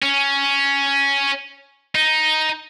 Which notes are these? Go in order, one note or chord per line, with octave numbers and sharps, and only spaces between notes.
C#4
D#4